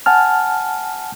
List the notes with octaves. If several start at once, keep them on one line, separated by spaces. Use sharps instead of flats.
F#5 G#5 A5 F6